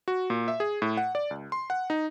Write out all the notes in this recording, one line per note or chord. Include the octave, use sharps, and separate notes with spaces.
F#4
A#2
E5
G#4
A2
F#5
D5
C#2
C6
F#5
D#4